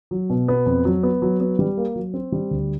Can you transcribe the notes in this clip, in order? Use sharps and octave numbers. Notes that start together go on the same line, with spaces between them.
F#3
B2
B3
F2
F#3
B3
F#3
B3
G3
A#3
F#3
C4
G3
D2